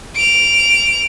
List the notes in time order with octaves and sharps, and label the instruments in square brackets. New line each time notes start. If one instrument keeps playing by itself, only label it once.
[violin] D7 F7